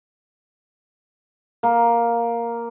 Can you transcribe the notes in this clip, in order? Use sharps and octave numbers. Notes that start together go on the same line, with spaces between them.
A#3